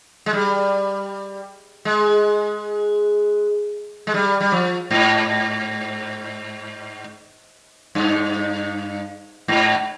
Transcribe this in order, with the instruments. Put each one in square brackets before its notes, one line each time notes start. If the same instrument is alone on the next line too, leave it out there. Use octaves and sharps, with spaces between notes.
[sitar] G#3
G3
G#3
G#3
G3
G3
F3
G#2
G2
G#2